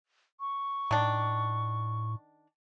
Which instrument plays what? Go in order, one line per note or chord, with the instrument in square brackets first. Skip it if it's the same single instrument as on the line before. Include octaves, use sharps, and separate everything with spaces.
[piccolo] C#6
[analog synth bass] A2 [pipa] D#3 D4